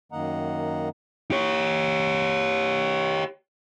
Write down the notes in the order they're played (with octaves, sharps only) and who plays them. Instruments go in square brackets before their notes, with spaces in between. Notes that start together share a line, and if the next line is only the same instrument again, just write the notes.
[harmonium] F#2 D#3 A#3 D#5 F#5 A#5
[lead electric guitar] G4 C#5